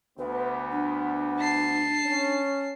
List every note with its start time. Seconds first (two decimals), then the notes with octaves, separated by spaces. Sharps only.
0.18 D2 B3 B4
0.72 D4
1.39 A5 C7
2.05 C#4